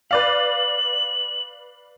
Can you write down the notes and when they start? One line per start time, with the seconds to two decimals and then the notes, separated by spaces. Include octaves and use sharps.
0.11 B4 D5 F5 F#7